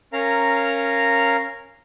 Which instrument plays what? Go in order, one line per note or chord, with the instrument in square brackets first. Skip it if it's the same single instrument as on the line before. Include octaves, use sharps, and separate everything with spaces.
[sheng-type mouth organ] C#4 A#4 F5 A#5